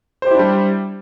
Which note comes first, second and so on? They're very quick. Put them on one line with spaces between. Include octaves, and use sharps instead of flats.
C5 G4 E4 D4 G3